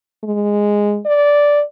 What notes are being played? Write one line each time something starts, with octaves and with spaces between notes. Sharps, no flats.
G#3
D5